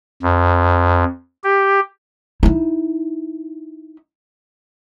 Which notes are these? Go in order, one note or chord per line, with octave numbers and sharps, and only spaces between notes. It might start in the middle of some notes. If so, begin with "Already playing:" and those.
F2
G4
D#4 E4